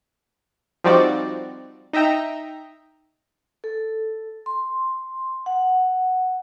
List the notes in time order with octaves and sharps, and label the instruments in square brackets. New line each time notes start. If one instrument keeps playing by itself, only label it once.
[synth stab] F3 G3 C4 D#4 F#4 D5
D#4 D#5 E5 G5 A#5
[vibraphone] A4
C6
F#5